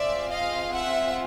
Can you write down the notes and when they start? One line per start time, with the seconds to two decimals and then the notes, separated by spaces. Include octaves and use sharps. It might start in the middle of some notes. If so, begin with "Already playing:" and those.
Already playing: C4 F4 G#4 D5 E5
0.31 D#5 F5
0.74 E5 F#5